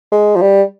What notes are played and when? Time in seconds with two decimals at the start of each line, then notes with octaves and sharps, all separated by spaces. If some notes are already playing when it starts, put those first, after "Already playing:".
0.12 G#3
0.36 F3
0.42 G3